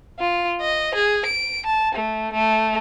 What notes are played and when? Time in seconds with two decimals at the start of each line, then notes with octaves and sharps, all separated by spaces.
0.19 F4
0.61 D#5
0.95 G#4
1.26 D7
1.66 A5
1.95 A3
2.33 A3